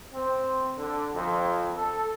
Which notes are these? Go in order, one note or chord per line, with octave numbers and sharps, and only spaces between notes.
C4
D3
F2
A4